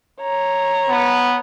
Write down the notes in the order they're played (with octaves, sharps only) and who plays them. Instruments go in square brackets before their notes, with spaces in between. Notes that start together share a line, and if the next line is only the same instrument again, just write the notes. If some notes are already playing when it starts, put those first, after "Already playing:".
[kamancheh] C#5 A#5
[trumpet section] B3